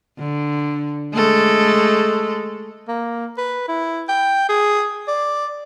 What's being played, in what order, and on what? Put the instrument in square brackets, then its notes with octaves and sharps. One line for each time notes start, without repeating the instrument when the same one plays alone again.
[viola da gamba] D3
G#3 A3 A4
[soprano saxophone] A#3
B4
E4
G5
G#4
D5